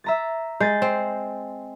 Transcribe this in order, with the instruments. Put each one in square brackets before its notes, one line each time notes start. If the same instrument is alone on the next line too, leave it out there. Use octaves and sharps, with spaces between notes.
[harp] E5 A#5 A6
[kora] G#3 [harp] G6 A6
[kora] C4